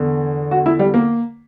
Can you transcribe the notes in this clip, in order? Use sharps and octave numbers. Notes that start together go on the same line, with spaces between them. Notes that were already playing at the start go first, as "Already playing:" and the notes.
Already playing: E2 D3
F#4
E4
G3
A#3